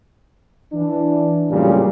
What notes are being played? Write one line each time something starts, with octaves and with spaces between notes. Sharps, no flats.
E3 D4
A1 F#2 A#2 C#3 G3